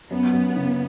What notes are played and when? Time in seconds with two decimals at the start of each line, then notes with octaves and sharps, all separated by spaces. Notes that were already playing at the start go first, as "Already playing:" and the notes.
0.11 F#2 B3
0.33 F#2
0.56 C#3